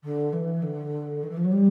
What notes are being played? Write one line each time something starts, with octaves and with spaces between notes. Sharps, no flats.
D3
E3
D3
D#3
E3
F3
F#3
G3